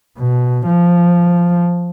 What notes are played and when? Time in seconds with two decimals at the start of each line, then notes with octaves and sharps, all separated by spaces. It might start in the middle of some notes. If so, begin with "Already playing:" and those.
0.18 B2
0.66 F3